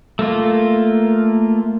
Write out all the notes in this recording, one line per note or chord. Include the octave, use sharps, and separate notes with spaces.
A3 A#3 F4